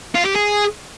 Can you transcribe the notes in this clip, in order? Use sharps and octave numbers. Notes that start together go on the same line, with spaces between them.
F4
G4
G#4